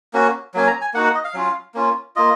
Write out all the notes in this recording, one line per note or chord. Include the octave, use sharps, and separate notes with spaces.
A#3 C#4 F#4
F#3 A#3 C#4 G#5
A#5
G#5
A#3 D#4 F#4 F#5
F#5
D#5
F5
F#3 C#4 F4
A#3 C#4 F4
A#3 F4 D#5